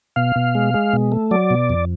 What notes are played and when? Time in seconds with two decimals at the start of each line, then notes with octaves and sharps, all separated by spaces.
0.16 B2 F5
0.36 B2
0.55 G#3
0.74 G#3
0.93 B2
1.12 A3
1.31 F#3 D5
1.50 B2
1.70 F2